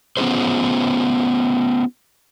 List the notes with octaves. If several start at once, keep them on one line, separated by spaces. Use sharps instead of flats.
B3 C#4 F4 G#4 C5